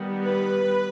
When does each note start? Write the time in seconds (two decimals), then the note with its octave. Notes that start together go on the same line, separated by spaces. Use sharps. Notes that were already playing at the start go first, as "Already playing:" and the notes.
Already playing: D#3 G3 B3
0.23 B4